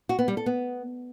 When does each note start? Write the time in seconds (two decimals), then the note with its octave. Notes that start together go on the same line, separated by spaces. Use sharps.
0.09 F#4
0.19 B3
0.28 G3
0.37 A4
0.46 B3